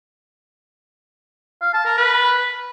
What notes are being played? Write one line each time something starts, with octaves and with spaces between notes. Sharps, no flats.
F5
A5
A#4
B4